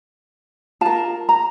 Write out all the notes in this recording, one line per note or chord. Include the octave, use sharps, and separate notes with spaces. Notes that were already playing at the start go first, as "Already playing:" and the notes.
F4 A#4 A5
A#5